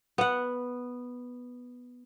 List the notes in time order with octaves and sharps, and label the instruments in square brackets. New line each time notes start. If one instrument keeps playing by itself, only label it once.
[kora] B3 F#5